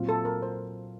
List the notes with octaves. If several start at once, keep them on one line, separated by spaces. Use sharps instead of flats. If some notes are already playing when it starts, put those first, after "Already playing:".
Already playing: A#2 F#3 C4 F4
A4
A#4
C5